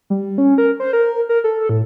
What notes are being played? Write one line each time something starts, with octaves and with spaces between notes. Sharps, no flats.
G3
C#4
A#4
C5
A#4
A#4
A4
A2